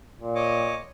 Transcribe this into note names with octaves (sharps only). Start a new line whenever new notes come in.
A#2
C#5 D#5 D6